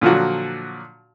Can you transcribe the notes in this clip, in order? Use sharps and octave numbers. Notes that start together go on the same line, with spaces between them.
A#2 D3 F3 F#3 F#4